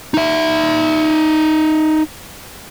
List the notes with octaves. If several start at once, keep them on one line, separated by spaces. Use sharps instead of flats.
D#4 E5